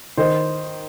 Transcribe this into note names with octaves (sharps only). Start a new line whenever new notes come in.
D#3 C5 D#5